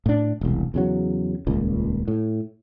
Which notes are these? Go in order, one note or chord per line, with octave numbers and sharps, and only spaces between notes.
A2 D4
E1 C2
E2 C#3 F#3
D#1 C#2 A#2
A2